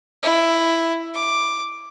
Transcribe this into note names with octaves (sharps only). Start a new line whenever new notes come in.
E4
D6